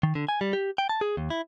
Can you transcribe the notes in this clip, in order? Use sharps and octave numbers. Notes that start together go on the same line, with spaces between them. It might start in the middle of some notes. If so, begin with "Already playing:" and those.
D#3
D3
G#5
G3
G4
G5
A5
G#4
D#2
E4